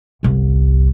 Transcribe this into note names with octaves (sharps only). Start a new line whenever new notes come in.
G1 C2